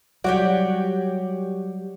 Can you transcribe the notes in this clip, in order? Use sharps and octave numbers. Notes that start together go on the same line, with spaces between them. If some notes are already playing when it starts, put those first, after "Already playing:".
F#3 G3 F#4 G4 C#5 D5